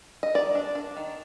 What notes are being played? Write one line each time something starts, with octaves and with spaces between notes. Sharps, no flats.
D#5
D#3 D5
D4
D4
D#3